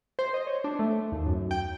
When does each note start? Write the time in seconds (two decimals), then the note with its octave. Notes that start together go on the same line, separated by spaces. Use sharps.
0.19 C5
0.34 D#5
0.47 C#5
0.64 D4
0.79 A3
1.12 D#2
1.26 F#2
1.51 G5